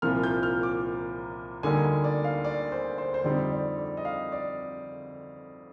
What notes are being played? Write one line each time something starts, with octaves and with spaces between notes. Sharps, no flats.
C2 A#2 F3 F6
G6
F6
D6
D2 D3 G3 A#3 D#4 G#5
G#5
D5
F5
D5
C5
C5
C5
F2 D3 G3 C4 D#4 D5
D5
D5
D#5
F5
D5